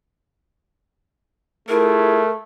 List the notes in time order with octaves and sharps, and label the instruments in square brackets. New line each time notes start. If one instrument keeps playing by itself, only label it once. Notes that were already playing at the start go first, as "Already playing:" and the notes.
[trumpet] A3 [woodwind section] E4 F4 G#4 [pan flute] A#4